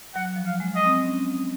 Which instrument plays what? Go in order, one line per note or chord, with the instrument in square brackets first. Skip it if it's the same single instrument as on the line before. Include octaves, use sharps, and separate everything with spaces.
[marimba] F#3 [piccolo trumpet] F#5
[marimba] F#3
F3
[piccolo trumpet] F5
[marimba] G#3
[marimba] G#3 [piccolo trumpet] D#5
[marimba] C4
C4
C#4